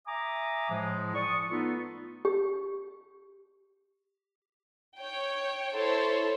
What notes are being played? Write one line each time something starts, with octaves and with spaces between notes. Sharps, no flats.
E5 G#5 A#5 D6 D#6
A2 F3 G#3
D5 C#6 D#6
A3 B3 D#4 F4 A4 B4
G4
C#5 G5
E4 A4 C5 C#5